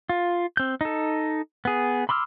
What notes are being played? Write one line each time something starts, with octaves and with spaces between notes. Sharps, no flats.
F4
C4 G6
D#4 A4
B3 G#4
B5 C6 D6 E6 F6